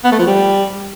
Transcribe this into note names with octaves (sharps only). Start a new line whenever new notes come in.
B3
A3
F3
G3